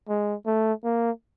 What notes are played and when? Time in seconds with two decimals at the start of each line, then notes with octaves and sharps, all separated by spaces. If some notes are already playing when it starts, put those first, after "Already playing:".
0.08 G#3
0.46 A3
0.84 A#3